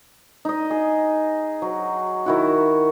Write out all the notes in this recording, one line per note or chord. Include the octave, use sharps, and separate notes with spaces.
D#4 D#5
G#4
F#3
D#3 E4 F#4